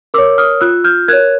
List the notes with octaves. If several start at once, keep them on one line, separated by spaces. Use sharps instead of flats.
A#4 C#5 D6 E6
D#6 F6
F4 E6 F#6
F6 G6
A#4 C#5 F#6 G#6